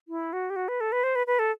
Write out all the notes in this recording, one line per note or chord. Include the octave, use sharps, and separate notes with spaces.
E4
F#4
G4
F#4
B4
A4
B4
C5
B4
B4
A4